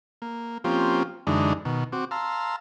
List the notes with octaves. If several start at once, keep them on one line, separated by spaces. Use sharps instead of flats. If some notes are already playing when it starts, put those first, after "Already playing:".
A#3
F3 A#3 C4 C#4 F4 G4
F#2 D3 E3 G#3 D4 D#4
B2 D#3
C4 F#4 D6
F5 A5 A#5 C6 E6